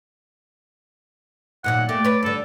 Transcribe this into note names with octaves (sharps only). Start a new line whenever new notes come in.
D#2 A#2 F#3 F#5
A3 A#3 G4 D5
B4 C#5
G2 D3 A4